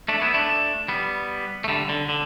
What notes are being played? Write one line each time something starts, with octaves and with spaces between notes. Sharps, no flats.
A3 D4
B3 E4
A3 D4
G3 B3
A3
D3 G3
D3
D3